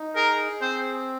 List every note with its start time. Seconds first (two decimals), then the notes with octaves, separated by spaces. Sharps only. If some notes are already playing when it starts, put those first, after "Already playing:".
Already playing: D#4
0.16 G#4 A#4
0.61 C4 C5